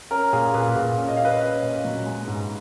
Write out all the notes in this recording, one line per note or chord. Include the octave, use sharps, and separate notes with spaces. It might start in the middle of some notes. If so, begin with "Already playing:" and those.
C#4 A#4
A#2 G#4
A#2 G#4 B4
A#2
C#4
D#5
C#4 F5
B4 D#5
C#4
A#2
F#3
G#3
G#2